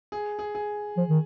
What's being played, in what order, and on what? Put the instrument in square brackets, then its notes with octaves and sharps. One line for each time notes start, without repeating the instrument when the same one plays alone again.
[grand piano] G#4
G#4
G#4
[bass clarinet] F3
D#3